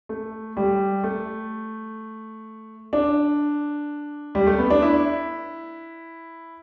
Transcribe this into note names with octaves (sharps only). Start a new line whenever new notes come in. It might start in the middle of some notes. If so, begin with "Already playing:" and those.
A3
G3
A3
D4
G3
A3
B3
D4
E4